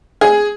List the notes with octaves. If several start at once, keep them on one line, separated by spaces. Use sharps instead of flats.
G#4